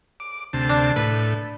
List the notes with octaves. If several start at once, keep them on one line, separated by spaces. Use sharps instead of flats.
D6
D2 C3 A5
D4
A2 B4